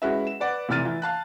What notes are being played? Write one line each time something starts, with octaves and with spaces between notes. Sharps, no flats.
G#3 C#4 E4 F#4 B4 E5
E7
B4 D5 F#5
F1 C3 E3 F6 A6 D#7
E3
F5 A5 F#6